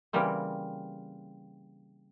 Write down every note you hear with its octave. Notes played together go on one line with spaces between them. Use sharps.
C#3 E3 G3 A#3 C4